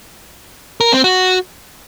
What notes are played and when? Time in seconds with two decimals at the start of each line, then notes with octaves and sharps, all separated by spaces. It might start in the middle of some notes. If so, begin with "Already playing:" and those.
0.80 A#4
0.92 C4
1.04 F#4